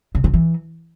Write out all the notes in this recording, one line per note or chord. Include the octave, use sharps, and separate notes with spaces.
C#3
D3
E3